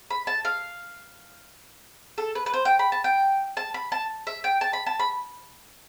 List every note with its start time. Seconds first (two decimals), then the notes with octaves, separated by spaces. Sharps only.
0.10 B5
0.27 A5
0.45 F5
2.18 A4
2.35 B4
2.46 B4
2.54 C5
2.65 G5
2.79 B5
2.92 A5
3.04 G5
3.57 A5
3.74 B5
3.92 A5
4.27 E5
4.44 G5
4.61 A5
4.73 B5
4.86 A5
4.99 B5